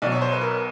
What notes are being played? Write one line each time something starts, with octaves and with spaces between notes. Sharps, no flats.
B1 B2 F#3 D5
C#5
C5
B4
A#4